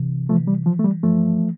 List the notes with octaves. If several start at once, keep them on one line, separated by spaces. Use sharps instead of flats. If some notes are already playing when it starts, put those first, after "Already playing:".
Already playing: C3 E3
E3 F3 A3
G3
E3 F3
A3
G3
G2 F3 A3